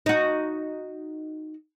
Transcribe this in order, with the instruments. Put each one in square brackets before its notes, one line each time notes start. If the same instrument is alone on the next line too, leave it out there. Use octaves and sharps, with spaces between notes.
[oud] D#4 F#4